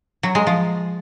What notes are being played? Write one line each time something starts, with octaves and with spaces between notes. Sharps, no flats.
F#3
G#3
F3